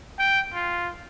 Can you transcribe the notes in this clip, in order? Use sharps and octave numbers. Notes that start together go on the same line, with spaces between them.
G5
F4